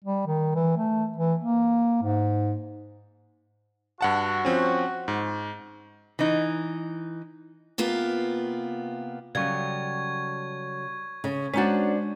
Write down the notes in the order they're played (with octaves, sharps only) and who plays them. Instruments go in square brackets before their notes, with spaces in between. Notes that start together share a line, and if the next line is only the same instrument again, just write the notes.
[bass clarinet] G3
D#3
E3
A3
E3
A#3
G#2
[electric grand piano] G2 F#5 A5 [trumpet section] F#4
[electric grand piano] F3 C4 C#4
G#2
[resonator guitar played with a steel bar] E3 D#4
[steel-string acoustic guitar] C3 A#3 B3 F4
[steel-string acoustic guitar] C#3 F#3 A4 [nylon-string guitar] G3 [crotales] C#6 G#6
[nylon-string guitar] C#3
[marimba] G#3 A#5 A6 [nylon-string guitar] C#4 F#4 [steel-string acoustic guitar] D4 C5